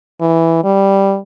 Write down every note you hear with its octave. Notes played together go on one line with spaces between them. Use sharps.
E3
G3